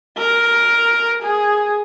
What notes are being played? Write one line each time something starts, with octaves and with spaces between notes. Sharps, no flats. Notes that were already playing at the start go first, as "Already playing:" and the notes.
A#4
G#4